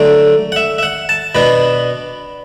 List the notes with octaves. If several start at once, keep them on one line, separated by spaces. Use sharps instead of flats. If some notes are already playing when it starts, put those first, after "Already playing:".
Already playing: D3 F#3 A3 D4 D5
F#5
E5
E5
F#5
A5
B2 B3 D4 B5